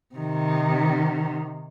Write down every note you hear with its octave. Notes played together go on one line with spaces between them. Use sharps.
C3 D#3